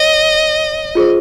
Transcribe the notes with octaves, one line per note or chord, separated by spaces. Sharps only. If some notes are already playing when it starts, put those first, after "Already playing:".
Already playing: C#5 D#5
F4 G#4 C5